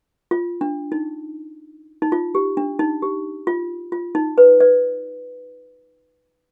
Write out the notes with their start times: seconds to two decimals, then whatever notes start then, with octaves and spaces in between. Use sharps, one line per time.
0.31 F4
0.61 D4
0.92 D#4
2.02 D#4
2.12 F4
2.35 G4
2.57 D4
2.79 D#4
3.02 G4
3.47 F4
3.92 F4
4.15 D#4
4.38 B4
4.60 B4 D5